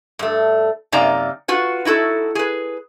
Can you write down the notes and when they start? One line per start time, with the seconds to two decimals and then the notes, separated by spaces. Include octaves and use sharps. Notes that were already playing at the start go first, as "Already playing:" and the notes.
0.19 G2 A3
0.92 F#2 C3 A#3 D#4 D5 A#5
1.48 F4 F#4 B4
1.85 D#4 E4 F#4 A4
2.35 G#4 B4